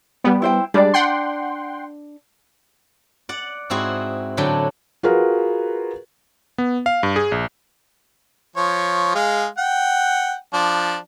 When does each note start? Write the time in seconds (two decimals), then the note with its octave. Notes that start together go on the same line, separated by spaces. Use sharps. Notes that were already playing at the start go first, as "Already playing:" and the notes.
0.24 G3 B3 G5
0.42 E4 C5 G5
0.74 G3 G#3 D4 D5
0.94 F#5 G5 C6
3.29 D5 F#5
3.70 G#2 C4 E4 F#4 G#4
4.37 A2 D3 F#3 D4 G5
5.03 F4 F#4 G#4 A#4 B4
6.58 B3
6.86 F5
7.03 G2
7.16 G#4
7.32 A#1
8.56 F3 C#5
9.15 G#3 G#4 F5
9.58 F#5 G5
10.54 F3 D4